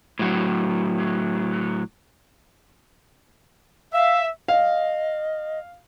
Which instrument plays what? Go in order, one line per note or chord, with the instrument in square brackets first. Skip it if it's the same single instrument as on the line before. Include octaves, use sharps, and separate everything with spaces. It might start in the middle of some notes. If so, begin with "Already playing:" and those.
[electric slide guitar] A2 F#3
[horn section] E5 [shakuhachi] F5
[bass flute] D#5 [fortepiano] F5